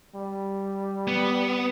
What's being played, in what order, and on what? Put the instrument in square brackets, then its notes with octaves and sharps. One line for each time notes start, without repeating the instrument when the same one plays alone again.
[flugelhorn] G3
[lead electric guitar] B3